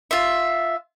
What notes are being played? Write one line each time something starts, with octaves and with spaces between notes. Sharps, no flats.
F4 E5